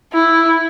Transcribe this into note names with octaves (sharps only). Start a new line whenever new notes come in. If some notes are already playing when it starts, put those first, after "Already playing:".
E4